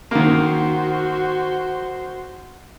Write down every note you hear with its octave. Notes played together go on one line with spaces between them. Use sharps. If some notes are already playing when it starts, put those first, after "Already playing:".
D#3 A#3 F#4 C5